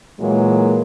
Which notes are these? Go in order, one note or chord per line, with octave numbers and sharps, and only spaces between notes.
A#2 E3 F#3 G#3 A#3